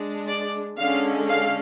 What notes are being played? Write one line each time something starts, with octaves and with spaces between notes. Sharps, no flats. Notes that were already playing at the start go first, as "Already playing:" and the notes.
Already playing: G#3 D4
D5
D3 G#3 C#4 F5
F5